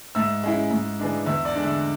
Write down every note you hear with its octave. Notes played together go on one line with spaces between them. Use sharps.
G#2 E5 E6
G#3 C#4 E4
G#2
E3 G#3 D4
E2 E5 E6
D5 D6
D3 G#3 D4
E5 E6